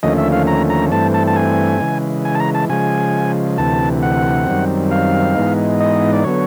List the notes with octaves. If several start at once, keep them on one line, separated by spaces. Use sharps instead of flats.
D#2 D3 F3 A3 C#4 D#5
E5
F5
A#5
A#5
G2 E3 A3 C4 A5
A5
A5
G#5
C#3 E3 G#3
G#5
A5
A#5
A5
C#3 F3 G#3 G#5
D2 C3 E3 A5
F#5
F#2 D#3 G3 C4
F5
G#2 E3 G#3 B3 D#4
D#5
D5
D3 F#3 B3 C#5